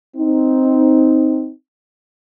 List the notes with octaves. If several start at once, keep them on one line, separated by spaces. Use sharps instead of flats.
C4 D#4